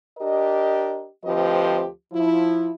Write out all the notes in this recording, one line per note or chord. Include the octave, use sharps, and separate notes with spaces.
D4 G4 A#4 D#5
D2 F3 C4 G4 B4 D#5
F3 E4